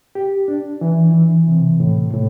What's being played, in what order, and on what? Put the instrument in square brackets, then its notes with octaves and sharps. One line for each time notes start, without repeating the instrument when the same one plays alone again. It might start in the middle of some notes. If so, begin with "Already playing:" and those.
[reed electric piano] G4
D4
E3
E3
C3
A2
A2